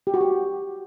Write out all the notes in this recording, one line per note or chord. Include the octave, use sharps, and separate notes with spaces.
G4
F#4
G4